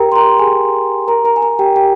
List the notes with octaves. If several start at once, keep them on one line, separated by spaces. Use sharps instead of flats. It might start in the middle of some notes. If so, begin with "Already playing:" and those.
Already playing: G4 A#4 G5 A#5
C6
A#4 A#5
G#4 G#5
A#4 A#5
A#4 A#5
G#5
A#4 A#5
G4 G5
G4 G5